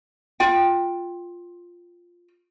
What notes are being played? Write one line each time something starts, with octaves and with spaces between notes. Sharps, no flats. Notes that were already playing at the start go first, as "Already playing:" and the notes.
F4 G5